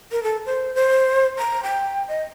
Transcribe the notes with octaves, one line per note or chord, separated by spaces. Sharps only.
A#4
A4
C5
C5
A#5
G5
D#5